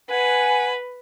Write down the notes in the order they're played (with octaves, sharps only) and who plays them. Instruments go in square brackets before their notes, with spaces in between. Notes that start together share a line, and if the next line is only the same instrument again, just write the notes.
[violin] B4 [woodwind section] F#5 G#5